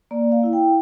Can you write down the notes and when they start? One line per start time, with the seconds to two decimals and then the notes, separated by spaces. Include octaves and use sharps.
0.11 A#3 D5
0.32 F5
0.43 E4 F5
0.53 G5